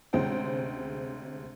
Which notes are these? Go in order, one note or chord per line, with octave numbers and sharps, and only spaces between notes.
D2 C3 G#3 C#4 C5 G5